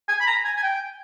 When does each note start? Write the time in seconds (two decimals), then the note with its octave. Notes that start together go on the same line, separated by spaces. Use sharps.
0.08 G#5
0.20 B5
0.27 A#5
0.45 G#5
0.56 G#5
0.63 G5